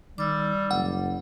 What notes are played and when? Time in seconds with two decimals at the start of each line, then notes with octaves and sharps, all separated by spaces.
0.18 D#3 G3 D6 E6
0.71 F#1 F#5